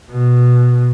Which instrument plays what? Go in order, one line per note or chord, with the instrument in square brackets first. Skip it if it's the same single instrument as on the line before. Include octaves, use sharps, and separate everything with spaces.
[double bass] B2